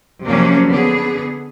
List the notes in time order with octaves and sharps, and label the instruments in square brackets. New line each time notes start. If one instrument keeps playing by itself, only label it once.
[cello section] C3 F3 F#3 A#3 C#4 D4
D3 B3 G#4